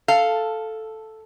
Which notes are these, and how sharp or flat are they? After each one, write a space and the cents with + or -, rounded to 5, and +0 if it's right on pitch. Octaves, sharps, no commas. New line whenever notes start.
A4 +0 F5 +0